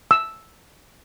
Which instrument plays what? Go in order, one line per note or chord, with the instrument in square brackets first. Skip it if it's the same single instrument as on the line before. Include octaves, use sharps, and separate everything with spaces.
[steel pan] E6